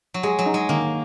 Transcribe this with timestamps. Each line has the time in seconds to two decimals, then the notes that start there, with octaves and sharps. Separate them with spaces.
0.14 F#3
0.23 G#3 G#4
0.39 F#3
0.46 D#4
0.54 G#3
0.69 D#3 A#3